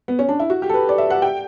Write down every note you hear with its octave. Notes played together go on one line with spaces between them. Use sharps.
B3
C#4
D4
E4
F#4
G4
A4
B4
D5
E5
F#5
G5